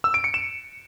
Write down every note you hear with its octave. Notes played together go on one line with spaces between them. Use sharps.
E6
D7
C#7
E7